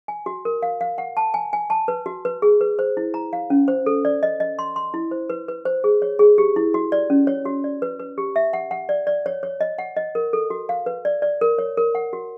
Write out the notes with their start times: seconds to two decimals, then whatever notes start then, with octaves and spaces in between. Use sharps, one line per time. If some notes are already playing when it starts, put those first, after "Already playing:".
0.08 G#5
0.26 F#4
0.45 A#4
0.62 F5
0.81 F5
0.98 F#5
1.17 A5
1.34 G#5
1.53 G#5
1.70 A5
1.88 B4
2.06 F#4
2.25 B4
2.42 G#4
2.61 B4
2.79 C5
2.97 E4
3.14 A#5
3.33 F5
3.50 C#4
3.68 C5
3.86 A4
4.05 D5
4.23 D#5
4.40 D#5
4.59 C6
4.76 C6
4.94 E4
5.11 C5
5.30 B4
5.48 B4
5.65 C5
5.84 G#4
6.02 C#5
6.19 G#4
6.38 G4
6.56 E4
6.74 F#4
6.92 D5
7.10 C#4
7.27 C#5
7.45 F#4
7.64 D5
7.82 B4
7.99 B4
8.18 G4
8.36 E5
8.53 F#5
8.71 F#5
8.89 D5
9.07 D5
9.26 C#5
9.43 C#5
9.61 D#5
9.78 F#5
9.96 D#5
10.15 A#4
10.33 A4
10.50 F#4
10.69 F5
10.86 B4
11.05 D5
11.22 D5
11.41 A#4
11.58 C#5
11.77 A#4
11.95 F#5
12.13 F#4